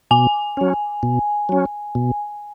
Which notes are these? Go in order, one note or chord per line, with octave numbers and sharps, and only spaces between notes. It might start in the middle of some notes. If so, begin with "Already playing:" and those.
B2 G#5
F#3 C#4
B2
F#3 C#4
B2